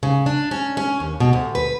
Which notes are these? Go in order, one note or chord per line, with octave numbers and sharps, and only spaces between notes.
C#3
D4
C#4
C#4
D#2
B2
D2
B4